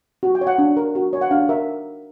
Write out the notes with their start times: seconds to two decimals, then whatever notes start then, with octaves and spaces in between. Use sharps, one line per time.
0.23 F#4
0.35 G5
0.41 C#5
0.47 F#5
0.58 D4
0.77 A#4
0.95 F#4
1.13 C#5
1.21 F#5
1.31 D4 F5
1.49 A#4 E5